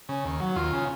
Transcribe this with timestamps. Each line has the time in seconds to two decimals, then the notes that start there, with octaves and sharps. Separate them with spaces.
0.09 C#3
0.25 D#2
0.40 F#3
0.56 D#2 F4
0.73 C#3